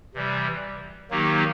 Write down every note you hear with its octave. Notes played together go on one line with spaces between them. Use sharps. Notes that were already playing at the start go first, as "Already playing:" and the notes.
C3 E3 G3
D#3 F#3 A#3 D#4 G4